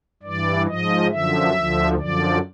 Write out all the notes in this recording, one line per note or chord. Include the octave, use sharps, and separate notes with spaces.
G2 E3 D5
G#2 F3 D#5
F#2 D3 F3 E5
D2 D3 F3
F#2 D3 F3 D5